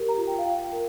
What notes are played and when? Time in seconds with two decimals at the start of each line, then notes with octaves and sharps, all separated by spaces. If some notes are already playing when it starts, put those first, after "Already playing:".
Already playing: G4 A#4
0.09 A#5
0.18 F4
0.27 G5
0.38 F5
0.45 F4 G5
0.63 G5
0.73 A#4